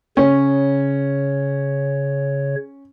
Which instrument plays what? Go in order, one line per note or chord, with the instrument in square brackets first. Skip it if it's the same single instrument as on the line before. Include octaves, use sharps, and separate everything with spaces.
[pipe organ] C#3 C#5 [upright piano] C#4